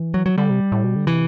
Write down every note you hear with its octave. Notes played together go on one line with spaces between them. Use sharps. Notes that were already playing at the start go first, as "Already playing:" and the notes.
Already playing: E3
F#3
F#3
D3 G3
C3
A2
B2
D3
C3 E3